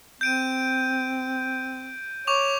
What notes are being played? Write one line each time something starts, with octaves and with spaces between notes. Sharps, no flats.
C4 G6 D7 D#7
C#5 C#6 D6 F7